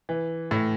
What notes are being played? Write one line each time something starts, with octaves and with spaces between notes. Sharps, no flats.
E3
A2